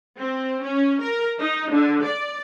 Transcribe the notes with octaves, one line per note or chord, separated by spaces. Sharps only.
C4
C#4
A#4
D#4
D3
D5